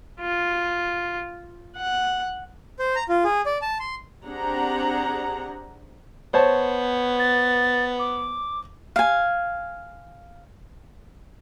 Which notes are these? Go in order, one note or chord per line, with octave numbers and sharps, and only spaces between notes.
F4
F#5
C5
A#5
F4
G#4
D5
A5
C6
C4 D4 G4 G#4 F#5 A#5
B3 C5 C#5 A5
A6
D6
F5 G#5